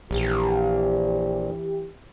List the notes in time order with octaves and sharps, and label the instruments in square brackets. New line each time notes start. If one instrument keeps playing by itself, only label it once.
[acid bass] A#1 [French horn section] E3 G4